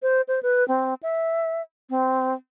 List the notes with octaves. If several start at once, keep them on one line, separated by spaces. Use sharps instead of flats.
C5
C5
B4
C4
E5
C4